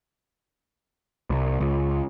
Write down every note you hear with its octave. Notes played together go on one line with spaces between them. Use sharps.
C2
C#2